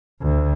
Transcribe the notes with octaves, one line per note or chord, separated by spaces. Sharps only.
D2